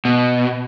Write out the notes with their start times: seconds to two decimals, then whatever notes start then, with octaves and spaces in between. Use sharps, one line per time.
0.05 B2